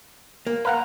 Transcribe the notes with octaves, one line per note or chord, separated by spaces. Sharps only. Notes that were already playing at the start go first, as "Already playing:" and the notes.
A#3
B4 F5 F#5 A#5